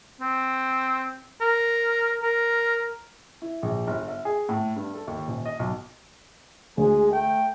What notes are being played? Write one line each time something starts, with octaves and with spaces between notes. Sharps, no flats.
C4
A#4
A#4
E4
A#1
G1
E5
G#4
A2
G2
A4
D#2
D#1
D#5
B1
D2 G#3 G#4
A3 G5